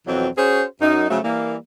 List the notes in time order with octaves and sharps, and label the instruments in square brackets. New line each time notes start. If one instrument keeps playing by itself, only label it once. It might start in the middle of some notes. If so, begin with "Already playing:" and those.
[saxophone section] F2 B2 E3 F#3 C4
C#4 F#4 G#4 C5
F#2 D#4
C#3 F3 F#3 A3
E3 G3 A#3